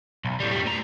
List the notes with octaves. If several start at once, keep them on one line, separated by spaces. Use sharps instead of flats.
B1
A2 G3
F2 G3
A2 A#5